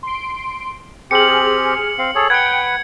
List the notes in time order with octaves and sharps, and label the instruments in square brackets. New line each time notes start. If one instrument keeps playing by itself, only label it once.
[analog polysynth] C6 D7
[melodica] C4 G4 [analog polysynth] G#4 F6 [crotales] C#7 F#7
[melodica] C4 F5
G#4 A4 C#5
[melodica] B4 F#5 [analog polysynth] G5 [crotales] G#6 C#7